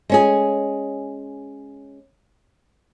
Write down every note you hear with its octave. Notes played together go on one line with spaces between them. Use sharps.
G#3 C#4 G#4